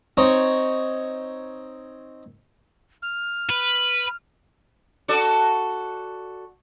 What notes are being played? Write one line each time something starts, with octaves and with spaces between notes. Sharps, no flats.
C4 D#4 C#5
F6
B4
F#4 A4 D5